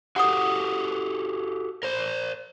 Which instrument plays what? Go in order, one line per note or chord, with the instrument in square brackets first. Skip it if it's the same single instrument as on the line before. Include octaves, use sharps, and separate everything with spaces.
[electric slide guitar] F#4 G4 A4 [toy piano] F#5 D#6
[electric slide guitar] A#4 C5